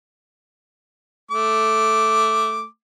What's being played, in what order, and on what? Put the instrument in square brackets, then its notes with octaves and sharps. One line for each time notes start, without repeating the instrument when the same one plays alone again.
[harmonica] A3 D6